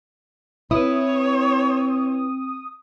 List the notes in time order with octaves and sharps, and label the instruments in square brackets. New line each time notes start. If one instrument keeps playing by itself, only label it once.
[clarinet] C4 [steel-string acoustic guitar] E4 B4 [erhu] C#5 [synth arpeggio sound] D#6